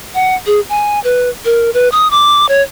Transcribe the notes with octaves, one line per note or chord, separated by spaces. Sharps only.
F#5
G#4
G#5
B4
A#4
B4
D#6
D6
C#5